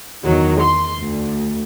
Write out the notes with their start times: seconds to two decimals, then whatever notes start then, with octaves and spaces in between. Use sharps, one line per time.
0.23 E2 D#3 F#3
0.61 C6
0.98 D2